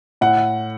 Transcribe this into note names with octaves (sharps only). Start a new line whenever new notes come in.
A2 F#5